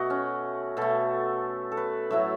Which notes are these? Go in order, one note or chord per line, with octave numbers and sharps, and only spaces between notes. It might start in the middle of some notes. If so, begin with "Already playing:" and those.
Already playing: B2 A3 F#4 D#5 F#5
C#4
B2 A3 A4
A4
B4
A2 F#3 A3 E5